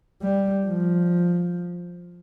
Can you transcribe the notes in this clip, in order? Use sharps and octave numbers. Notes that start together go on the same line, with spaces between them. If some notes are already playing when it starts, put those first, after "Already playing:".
G3
F3